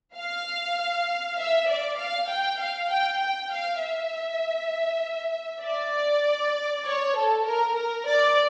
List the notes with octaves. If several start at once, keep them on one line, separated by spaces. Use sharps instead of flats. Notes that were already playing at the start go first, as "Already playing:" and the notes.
F5
E5
D5
F5
G5
F5
G5
G5
F5
E5
D5
C#5
A4
A#4
A#4
D5